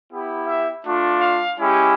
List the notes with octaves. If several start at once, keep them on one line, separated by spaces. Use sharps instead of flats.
B3 E4 G4
E5
A3 D4 F4
F5
G#3 C#4 E4 G4